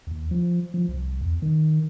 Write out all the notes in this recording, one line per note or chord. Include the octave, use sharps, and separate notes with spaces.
D#2
F3
F3
C2
E2
D#3